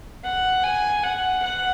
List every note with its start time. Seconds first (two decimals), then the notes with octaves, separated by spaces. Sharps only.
0.24 F#5
0.64 G#5
1.03 F#5
1.42 F#5